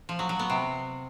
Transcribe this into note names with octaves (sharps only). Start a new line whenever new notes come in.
F3
F#3
F#3
B3
C3